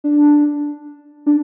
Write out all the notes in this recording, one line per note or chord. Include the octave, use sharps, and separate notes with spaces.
D4
D4